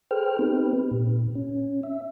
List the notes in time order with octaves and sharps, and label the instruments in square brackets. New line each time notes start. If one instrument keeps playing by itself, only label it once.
[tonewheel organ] G#4 A4 B4 C5 G5 F6
B3 C4 D#4 G4 B4
A#2
C#4
E5